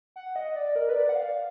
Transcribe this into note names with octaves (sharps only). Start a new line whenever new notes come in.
F#5
D#5
D5
A#4
B4
D5
F#5
F5